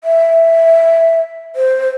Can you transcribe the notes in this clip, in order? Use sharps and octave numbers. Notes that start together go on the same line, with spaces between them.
E5
C5